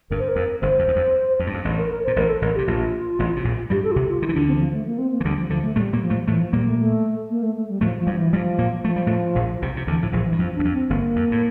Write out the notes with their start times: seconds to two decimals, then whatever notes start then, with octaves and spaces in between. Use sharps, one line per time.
0.11 G1 G2 A#4
0.19 C5
0.28 A#4
0.36 F2
0.61 G1 G2 C5
0.79 F2
0.88 E2
0.96 F2
1.39 F2
1.47 G2
1.54 F2
1.65 A1 A2
1.78 A#4
1.90 A#4
2.04 A#2 C5
2.16 A1 A2 A#4
2.29 A4
2.42 A1 A2 A#4
2.55 C3 G4
2.67 A#1 A#2 F4
3.19 A1 A2
3.36 C3
3.45 A#1 A#2
3.70 G2 G3 G4
3.84 A4
3.92 F4
3.96 C2 C3 G4
4.09 F4
4.22 D3 E4
4.29 E3
4.34 D2 D3 D4
4.47 C4
4.55 E3
4.60 F3
4.74 A3
4.86 A#3
4.98 C4
5.12 A#3
5.20 E3
5.24 D2 D3 G3
5.38 F3
5.50 D2 D3 F3
5.63 A3
5.76 A2 G3 A3
5.93 A#2 A#3
6.02 F3
6.10 A2 A3
6.27 A2 E3 A3
6.40 F3
6.53 A#2 G3 A#3
6.67 A3
6.78 A3
7.30 A#3
7.43 A3
7.56 A3
7.69 G3
7.81 A2 F3 A3
7.99 F3
8.07 G2 G3
8.16 E3
8.33 G2 F3 G3
8.58 A#2 A#3
8.84 F3 A3
8.96 G3
9.07 A2 A3
9.35 A#1 A#2
9.62 C2 C3
9.77 C3
9.87 D2 D3 E3
10.01 A2 F3
10.13 A#1 A#2 F3
10.26 E3
10.32 G2
10.38 F2 F3
10.55 E2 D4
10.65 F2
10.73 C4
10.90 G1 G2 A#3
11.16 F2
11.31 A2